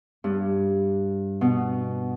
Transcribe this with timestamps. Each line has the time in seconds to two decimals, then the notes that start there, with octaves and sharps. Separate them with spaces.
0.24 G2
1.41 B2